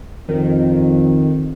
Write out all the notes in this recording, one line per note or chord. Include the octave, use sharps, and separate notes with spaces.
F2 D#3